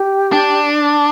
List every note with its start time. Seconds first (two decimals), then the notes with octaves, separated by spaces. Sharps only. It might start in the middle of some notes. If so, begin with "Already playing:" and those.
Already playing: G4
0.32 D4